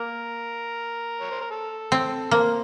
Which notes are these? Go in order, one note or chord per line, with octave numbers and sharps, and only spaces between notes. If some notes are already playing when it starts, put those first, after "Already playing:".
Already playing: A#3 A#4
C#5
C5
A#4
A4
C4
A#3 A4 C5